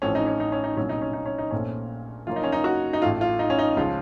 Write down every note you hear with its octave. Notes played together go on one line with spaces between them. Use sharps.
A1 A2 F3 C4 C#4
D#4
C#4
D#4
C#4
D#4
C2 A#2 F#3 C#4
D#4
C#4
D#4
C#4
D#4
A#1 A#2 A3 C4 C#4
F#1 F#2 F3 A#3 C#4 F4
D#4
C#4
D#4
F#4
D#4
A1 A2 A3 F4
F4
D#4
C#4
D#4
C#2 C#3 F3 F4